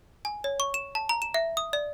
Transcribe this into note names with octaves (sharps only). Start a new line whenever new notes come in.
G#5
C#5
C#6
E7
A5
A#5
E7
E5
D#6
D5